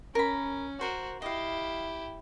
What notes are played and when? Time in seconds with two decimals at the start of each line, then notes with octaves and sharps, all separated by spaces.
0.15 C#4 A#4 B5
0.81 F#4 A#4 C5
1.22 E4 G4 D#5 F5